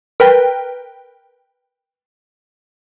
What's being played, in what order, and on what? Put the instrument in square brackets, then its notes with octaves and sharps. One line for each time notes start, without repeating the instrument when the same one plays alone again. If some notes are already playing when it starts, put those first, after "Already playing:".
[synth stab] A#4 B4 G5